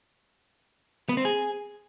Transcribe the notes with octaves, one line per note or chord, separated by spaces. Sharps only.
B3
C4
G#4